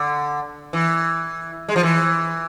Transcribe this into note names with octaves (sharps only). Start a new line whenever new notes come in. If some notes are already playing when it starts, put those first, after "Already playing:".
Already playing: D3
E3
G#3
F3
E3